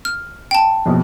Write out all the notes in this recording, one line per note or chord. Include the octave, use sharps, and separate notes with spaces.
F6
G5 A5
A#1 F2 B2